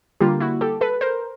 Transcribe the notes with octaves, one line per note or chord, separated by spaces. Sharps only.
D3 G3 A#3 F4 G4
E4 F#4
G4 A4
A4 B4
A#4 C5